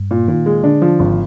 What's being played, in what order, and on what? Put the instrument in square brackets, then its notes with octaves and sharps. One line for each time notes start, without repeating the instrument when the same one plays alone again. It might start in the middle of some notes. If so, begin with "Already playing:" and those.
Already playing: [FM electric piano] G2
[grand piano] A#2
[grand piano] A#2 [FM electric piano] D#3
[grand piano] G#3
[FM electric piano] D3 [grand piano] D4
[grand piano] F3
G#1